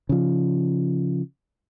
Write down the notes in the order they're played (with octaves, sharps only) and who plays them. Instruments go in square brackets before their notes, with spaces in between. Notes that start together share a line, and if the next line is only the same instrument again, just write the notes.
[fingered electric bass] C#3 F3